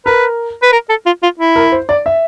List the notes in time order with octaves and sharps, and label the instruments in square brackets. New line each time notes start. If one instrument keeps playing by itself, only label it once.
[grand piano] A#4 [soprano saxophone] B4
[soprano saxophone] B4
A#4
A4
F4
F4
E4
[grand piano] A#4
C5
D5
E5